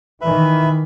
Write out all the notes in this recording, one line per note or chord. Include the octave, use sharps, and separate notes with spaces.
D#3 E3 B4 E5 B5